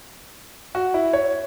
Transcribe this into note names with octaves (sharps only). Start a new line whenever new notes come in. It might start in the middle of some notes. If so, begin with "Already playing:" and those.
F#4
E4
C#5